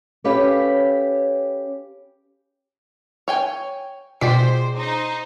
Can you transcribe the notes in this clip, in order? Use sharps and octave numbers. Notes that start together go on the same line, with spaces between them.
C#4 G4 A4 B4 C#5 F5
C#5 G5 G#5
B2 G#3 F4 C5 D5 G5 B6
D#4 C5